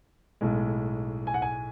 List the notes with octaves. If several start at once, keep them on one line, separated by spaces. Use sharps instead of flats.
B1 A2 G#3
G#5
F#5
G#5